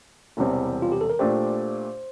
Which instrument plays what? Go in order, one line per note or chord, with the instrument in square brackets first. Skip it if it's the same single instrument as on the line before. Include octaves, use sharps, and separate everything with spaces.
[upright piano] E1 E2 C3 G3 C4
[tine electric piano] F4
G4
A4
A#4
[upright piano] A#2 A3 D4 G4 [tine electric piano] C5